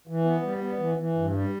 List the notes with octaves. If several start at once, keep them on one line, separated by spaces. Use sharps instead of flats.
E3
B3
G3
B3
E3
E3
G2
G3